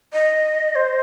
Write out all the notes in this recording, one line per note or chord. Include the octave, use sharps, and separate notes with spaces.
D#5
C5